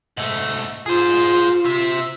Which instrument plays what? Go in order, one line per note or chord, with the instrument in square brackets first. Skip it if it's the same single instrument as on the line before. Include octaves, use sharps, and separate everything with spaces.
[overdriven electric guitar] G#2 A3
[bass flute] F4 [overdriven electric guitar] G#4 C5
[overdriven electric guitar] C5 E5